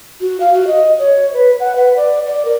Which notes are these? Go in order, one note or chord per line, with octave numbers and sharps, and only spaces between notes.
F#4
F5
F#4
D#5
C#5
B4
F#5
B4
D5
D5
A#4